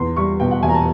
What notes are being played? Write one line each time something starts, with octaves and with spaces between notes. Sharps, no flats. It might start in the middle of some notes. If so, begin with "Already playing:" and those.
Already playing: E2 C6
G3 C#6
B2 G5
F#5
E1 G#5
A#5
A5